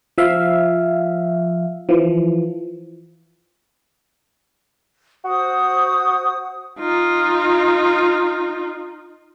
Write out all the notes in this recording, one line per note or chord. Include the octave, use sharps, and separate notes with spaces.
F3 E5 F5
E3 F3
F#4 C5 D#6
D#4 F4